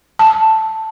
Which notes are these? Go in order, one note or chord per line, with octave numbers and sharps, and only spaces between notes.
A5